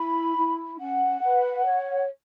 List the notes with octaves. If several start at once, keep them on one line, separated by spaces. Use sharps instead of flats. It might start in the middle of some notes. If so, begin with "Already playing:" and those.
Already playing: E4 B5
E4
C#4 F#5
B4
C#5